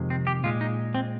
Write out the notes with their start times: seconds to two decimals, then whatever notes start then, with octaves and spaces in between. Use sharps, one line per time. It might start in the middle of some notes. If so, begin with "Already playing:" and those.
Already playing: F2 C3 D#3 G#3
0.10 C4
0.27 G4
0.44 A#2 G#3 F4
0.61 D#4
0.94 C4